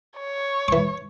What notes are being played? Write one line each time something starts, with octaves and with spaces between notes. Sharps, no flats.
C#5
E3 C#6